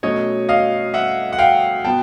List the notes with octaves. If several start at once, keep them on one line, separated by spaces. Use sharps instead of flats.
B2 F#3 A3 C#4 C#5 D#5
D#5 F5
E5 F#5
F#5
F5 G5
B2 F#3 B3 G5 A5